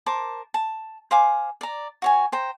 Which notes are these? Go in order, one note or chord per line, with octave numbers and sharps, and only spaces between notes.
A#4 C5 A5 D6
A5
C5 F5 G#5 D6
D5 A#5
F#4 C#5 G#5
C5 G5 A#5